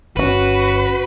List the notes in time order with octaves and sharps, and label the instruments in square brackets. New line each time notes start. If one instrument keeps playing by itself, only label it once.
[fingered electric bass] G1 C#3 C#4 [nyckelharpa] F#4 [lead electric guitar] B4